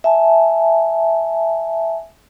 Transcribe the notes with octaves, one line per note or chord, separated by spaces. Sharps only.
E5 G#5 A5